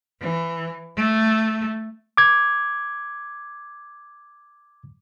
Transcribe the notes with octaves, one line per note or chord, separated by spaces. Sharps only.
E3
A3
D6 G#6